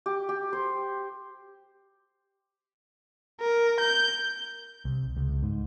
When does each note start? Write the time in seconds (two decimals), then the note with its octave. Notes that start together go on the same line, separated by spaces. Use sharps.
0.06 G4
0.29 G4
0.53 C5
3.41 A#4
3.80 G6
4.85 C2
5.16 C#2
5.43 G#2